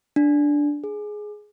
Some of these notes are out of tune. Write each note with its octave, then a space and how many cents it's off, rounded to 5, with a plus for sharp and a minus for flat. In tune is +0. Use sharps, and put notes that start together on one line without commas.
D4 -5
G#4 +10